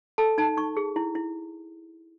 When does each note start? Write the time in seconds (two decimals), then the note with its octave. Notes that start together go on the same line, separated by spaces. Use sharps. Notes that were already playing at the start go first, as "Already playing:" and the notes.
0.18 A4 A5
0.38 D#4 A5
0.57 D#4 C#6
0.77 G#4
0.96 E4
1.15 E4